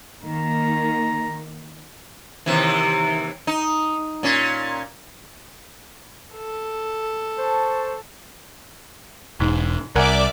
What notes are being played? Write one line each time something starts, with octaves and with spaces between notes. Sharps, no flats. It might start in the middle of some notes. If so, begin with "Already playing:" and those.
D#3 A#3 A#5
D#2 C3 E3
D#4
A#2 C#4
A4
C5 A5 C#6
E1 G#2
C2 A#4 D5 E5 F#5 G#5 D6